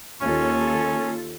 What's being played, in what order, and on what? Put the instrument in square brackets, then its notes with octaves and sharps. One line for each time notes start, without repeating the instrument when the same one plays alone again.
[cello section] D#2 F4 A4 [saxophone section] C#4